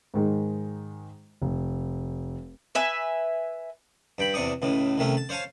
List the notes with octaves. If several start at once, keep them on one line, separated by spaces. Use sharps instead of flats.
G#2 D#3 G#3
F1
B4 E5 G#5
G2 G5 B5
E2 C3 D4 C#6 D#6
C#2 A2 C#3
C2 D#3 A3 C#4
A5
C5 C#5 F5 G#5 A5